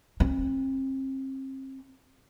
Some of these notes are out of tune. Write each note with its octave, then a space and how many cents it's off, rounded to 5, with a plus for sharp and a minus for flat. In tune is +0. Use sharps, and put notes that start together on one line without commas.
C4 +35